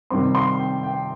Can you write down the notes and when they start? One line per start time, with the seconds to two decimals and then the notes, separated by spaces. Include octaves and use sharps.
0.10 C3 D#3 G3 C4 C6
0.35 C6
0.60 G5
0.83 G5